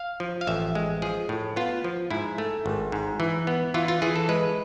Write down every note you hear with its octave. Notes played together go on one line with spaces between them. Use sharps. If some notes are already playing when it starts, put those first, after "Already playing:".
Already playing: F5
F3
F5
A1 E5
G#3
F3 G#4
A2
B3 F4
F3
G#2 E4
A3
G#1
G#2
E3
B3
E3 F4
F4
E3 G#4
A4
G#3 B4